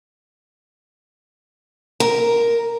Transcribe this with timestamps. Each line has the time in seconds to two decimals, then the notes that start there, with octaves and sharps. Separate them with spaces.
2.00 A#4